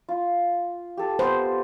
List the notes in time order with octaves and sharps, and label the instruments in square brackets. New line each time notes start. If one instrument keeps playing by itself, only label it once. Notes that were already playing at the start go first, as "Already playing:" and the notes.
[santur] F4
G4 A4
[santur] B3 [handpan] C5